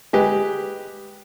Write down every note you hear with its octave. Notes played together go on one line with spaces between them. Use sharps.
G#3 G4 B4